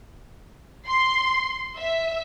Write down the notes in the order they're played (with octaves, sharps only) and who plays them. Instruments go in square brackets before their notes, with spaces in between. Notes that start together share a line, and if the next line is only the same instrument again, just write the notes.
[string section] C6
E5